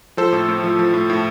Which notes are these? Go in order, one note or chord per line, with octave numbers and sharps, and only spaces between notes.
F3 A4 C5
A2
A2
F3
F3
A2
A2